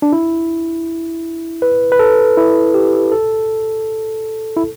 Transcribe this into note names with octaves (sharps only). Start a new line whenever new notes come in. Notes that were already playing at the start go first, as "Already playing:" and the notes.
D4
E4
B4
B4
A4
E4
G4
A4
E4